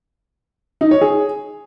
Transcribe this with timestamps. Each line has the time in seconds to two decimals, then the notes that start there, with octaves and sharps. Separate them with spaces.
0.81 D#4
0.91 C#5
1.01 G#4